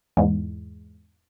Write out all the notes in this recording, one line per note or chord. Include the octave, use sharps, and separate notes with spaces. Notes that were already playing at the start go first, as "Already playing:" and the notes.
E2 G#2